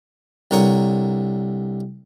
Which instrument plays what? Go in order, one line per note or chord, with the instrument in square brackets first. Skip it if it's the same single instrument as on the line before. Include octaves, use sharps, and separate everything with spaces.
[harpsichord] C2 D3 A#4 C#5 C#6 D#6